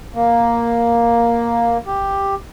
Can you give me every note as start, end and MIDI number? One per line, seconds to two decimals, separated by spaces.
0.15 1.77 58
1.86 2.35 67